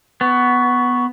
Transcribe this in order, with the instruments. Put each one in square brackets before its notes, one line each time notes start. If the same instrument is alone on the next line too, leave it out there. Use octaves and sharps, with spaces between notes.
[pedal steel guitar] B3 [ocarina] C#6